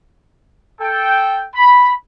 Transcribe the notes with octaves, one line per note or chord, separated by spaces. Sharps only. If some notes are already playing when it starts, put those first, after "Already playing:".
A4 G5
B5